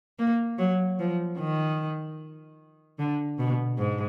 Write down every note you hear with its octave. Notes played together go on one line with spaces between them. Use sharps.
A#3
F#3
F3
D#3
D3
B2
G#2